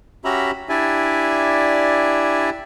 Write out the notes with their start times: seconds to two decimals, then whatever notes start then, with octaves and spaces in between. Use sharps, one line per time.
0.25 C#4 F#4 G4 E5 A#5 B5
0.69 D4 E4 G4 D5 E5 G#5